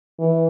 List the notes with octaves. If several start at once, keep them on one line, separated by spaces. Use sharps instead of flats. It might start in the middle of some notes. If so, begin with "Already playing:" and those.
E3